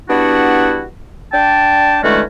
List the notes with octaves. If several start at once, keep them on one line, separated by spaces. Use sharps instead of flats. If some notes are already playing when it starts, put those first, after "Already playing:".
G3 B3 D4 E4 F#4
D4 G5 A5
D3 E3 G#3 A3 C#4 F#4